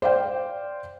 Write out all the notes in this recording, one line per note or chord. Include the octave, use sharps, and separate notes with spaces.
C5 D5 F5 G5